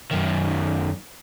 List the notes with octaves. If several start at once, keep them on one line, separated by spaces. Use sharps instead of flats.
F#2 D#3